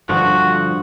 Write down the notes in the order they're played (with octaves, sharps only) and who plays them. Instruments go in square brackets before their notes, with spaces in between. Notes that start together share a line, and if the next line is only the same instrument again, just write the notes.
[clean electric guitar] G2 D3 F3 [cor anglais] F#4